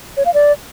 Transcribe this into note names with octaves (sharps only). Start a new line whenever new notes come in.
C#5
F5
D5